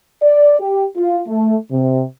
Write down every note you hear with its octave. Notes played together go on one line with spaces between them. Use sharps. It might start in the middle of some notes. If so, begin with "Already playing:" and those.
D5
G4
F4
A3
C3